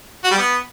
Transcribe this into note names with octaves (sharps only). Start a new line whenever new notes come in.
F#4
G3
B3